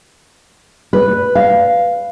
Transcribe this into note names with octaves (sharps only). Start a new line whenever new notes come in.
B4
F5